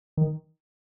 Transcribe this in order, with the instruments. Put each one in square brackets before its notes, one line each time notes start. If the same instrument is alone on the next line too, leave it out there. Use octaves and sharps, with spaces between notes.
[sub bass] D#3